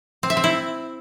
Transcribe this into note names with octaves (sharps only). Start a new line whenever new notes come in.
C4
E5
C4
E4